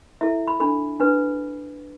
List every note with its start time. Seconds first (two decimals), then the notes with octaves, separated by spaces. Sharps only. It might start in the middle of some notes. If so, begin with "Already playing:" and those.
0.21 E4 A4 E5
0.47 B5
0.60 D4 A4 B5
1.00 D4 B4